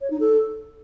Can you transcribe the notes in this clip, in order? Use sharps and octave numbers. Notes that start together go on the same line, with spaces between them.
C#5
D#4
A4